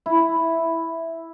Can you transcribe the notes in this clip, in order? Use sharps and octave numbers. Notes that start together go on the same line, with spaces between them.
E4